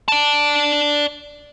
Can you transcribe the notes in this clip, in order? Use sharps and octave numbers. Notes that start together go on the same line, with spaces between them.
D5 A5